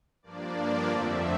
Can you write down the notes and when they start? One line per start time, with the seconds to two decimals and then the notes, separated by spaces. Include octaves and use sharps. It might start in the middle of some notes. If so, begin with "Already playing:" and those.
0.22 G2 F3 A#3 D4 D5
0.87 F2 D3 F3 A3 C4 E5